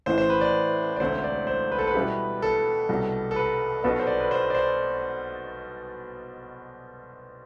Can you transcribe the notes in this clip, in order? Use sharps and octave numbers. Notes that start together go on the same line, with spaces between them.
A1 A2 E3 C5
C5
B4
D5
D5
E1 D2 D3 A3 C4 C5
D5
C5
B4
A4
B4
B2 G3 B3 E4 G4
A4
C2 B2 G3
A4
B4
B1 B2 B3 A4
C5
D5
B4
C5
D5
C5